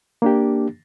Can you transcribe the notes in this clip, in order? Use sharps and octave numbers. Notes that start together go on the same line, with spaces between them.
A#3 D4 G4